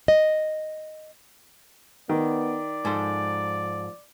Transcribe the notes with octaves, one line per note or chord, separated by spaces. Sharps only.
D#5
D#3 B3 D5
G#2 F3 A4 C5